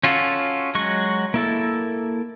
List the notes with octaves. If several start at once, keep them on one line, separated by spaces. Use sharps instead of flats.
C#4 F4 F#4 A4
F#3 G#3 F#4 C#6
A#3 E4 A4